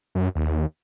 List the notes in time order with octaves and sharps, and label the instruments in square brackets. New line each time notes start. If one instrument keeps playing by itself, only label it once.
[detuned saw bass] F#2
D#2